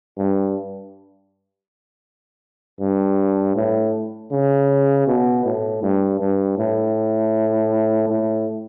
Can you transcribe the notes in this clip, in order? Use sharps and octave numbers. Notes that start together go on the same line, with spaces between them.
G2
G2
A2
C#3
B2
A2
G2
G2
A2
A2